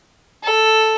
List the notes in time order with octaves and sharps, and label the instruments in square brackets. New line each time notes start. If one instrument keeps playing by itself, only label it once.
[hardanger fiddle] A4